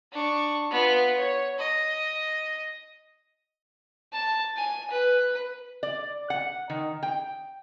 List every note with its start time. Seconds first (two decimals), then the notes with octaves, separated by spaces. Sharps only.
0.12 D4 C#6
0.70 B3 F4
1.17 C#5
1.59 D#5
4.13 A5
4.57 G#5
4.91 B4
5.83 D5
6.30 F#5
6.70 D#3
7.03 G5